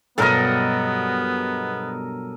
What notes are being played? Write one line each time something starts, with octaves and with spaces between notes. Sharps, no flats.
G2 B2 F#3 B3 A4 A#4 D#5